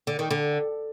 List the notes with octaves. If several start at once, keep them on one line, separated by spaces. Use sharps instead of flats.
D3
D#3
D3